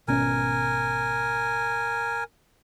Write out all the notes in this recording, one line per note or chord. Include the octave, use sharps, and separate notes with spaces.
G#1 B2 C#4 A#4 G#5